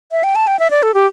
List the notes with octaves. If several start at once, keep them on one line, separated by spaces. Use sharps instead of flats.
E5
G5
A5
G5
E5
D5
A4
G4